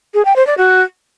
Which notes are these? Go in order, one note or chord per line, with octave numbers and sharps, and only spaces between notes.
G#4
G5
C5
D5
F#4